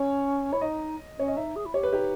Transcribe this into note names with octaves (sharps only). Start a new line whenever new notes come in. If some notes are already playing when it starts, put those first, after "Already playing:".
Already playing: C#4 C#5
E4 C#5
D#4 D#5
C#4 C#5
D#5
D#4 E5
G#4
E4
G4 C#5
B4
D#4 G4